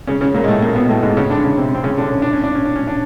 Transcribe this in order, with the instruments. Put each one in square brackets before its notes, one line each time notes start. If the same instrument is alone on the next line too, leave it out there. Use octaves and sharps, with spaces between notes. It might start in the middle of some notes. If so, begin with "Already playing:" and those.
[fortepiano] C#3 C#4
C#3 C#4
A#2 A#3
G#3
A2 A3
A#2 A#3
B2 B3
A2 A3
G#2 G#3
C#3 C#4
D3 D4
C#3 C#4
C3 C4
C4
C#3 C#4
D3 D4
C#4
D4
C#4
D4
C#4
D4
C#4
D4